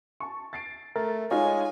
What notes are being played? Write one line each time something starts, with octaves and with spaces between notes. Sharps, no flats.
A5 C#6
A6 C7 D7
A3 A#4 A6
G#3 D#4 F4 C#5 F5 G#5